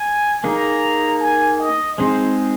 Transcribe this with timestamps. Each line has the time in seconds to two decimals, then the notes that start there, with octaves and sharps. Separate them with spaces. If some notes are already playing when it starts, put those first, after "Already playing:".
Already playing: G#5
0.44 A#3 D#4 G#4 A#5
1.21 G#5
1.60 D#5
1.98 G#3 C4 D#4 G#4 C5